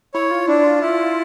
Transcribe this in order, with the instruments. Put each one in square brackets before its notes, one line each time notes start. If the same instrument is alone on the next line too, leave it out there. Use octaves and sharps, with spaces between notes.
[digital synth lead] E4 [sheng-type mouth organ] C#5
[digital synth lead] F4
[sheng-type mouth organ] D4 [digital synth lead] E4
[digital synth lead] F4
[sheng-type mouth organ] E4